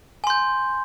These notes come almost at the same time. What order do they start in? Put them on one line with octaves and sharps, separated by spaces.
G#5 C6 G6